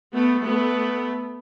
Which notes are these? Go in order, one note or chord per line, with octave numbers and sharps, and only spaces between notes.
A3 B3
A3 B3